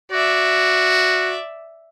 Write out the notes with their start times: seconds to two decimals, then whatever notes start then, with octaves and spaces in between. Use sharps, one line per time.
0.12 F#4 D5 E5